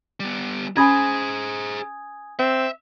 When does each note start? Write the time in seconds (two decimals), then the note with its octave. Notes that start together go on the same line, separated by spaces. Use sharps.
0.20 G3 B3
0.77 C#4 G#4 C5 G#5 B5 D#6 G#6
2.39 C4 E5